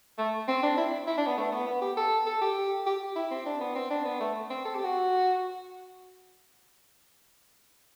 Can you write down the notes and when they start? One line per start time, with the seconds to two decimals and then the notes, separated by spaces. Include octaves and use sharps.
0.18 A3
0.48 C4
0.63 D4
0.77 E4
1.07 E4
1.17 D4
1.27 B3
1.37 A3
1.52 B3
1.67 B3
1.82 G4
1.97 A4
2.27 A4
2.41 G4
2.86 G4
3.16 E4
3.31 C4
3.46 D4
3.61 B3
3.76 C4
3.91 D4
4.05 B3
4.20 A3
4.50 C4
4.65 A4
4.75 G4
4.85 F#4